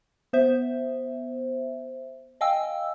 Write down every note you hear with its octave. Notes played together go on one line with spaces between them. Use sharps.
B3 C5 E5
D#5 F5 G5 G#5 E6